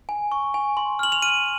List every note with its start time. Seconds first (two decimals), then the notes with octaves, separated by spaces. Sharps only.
0.09 G#5
0.32 C#6
0.54 G#5
0.77 C6
0.99 F6 F#7
1.12 F7
1.22 F6 D#7